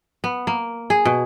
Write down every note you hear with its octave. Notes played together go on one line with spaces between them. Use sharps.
B3
A#3
G#4
B2